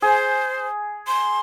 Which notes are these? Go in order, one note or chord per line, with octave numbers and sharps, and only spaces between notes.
G#4 C5
C6